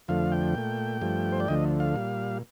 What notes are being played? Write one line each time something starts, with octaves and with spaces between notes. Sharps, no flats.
F2 D3 F3 A3 F5
G5
A#2 A3
G2 F3 A3
C5
D5
D2 D3 F3 A3 D#5
F5
A#2 G3